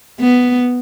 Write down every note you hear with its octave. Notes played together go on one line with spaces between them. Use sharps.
B3